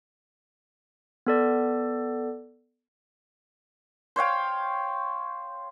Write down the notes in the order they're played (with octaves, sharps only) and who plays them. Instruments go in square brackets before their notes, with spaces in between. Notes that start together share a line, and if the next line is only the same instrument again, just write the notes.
[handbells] B3 A4 D5
[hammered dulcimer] C5 C#5 F5 G5